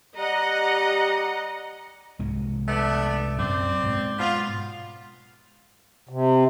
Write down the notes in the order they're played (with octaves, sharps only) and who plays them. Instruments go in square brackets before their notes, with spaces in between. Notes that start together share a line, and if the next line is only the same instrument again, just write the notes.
[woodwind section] G3 G4 A#5 [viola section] D#5 F#5
[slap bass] C2 G#2 G#3
[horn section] A3 B3 D4
[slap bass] F#2 A#2 F#3 [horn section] C4 D5
[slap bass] G#2 B2
[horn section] B3 F4
[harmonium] C3